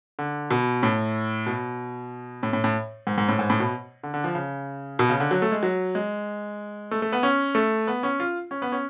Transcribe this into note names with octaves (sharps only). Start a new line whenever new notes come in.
D3
B2
A2
B2
A2
A2
A2
G#2
G#2
A2
G#2
A2
B2
D3
D3
F3
C#3
B2
C#3
D3
F#3
A3
G#3
F#3
G#3
A3
A3
B3
C#4
A3
B3
C#4
F4
C#4
B3
C#4